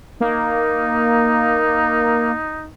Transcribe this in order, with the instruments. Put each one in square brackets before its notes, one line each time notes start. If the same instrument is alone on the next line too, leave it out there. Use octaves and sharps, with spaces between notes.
[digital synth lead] A#3 [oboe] D#4